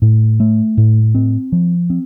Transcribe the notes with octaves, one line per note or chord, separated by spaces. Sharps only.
A2
A3
A2
C4
F3
C4